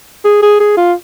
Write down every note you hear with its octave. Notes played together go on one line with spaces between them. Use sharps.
G#4
G#4
G#4
F4